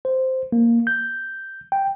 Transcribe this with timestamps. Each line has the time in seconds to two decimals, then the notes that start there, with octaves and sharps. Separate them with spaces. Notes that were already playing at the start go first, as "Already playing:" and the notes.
0.05 C5
0.52 A#3
0.87 G6
1.72 G5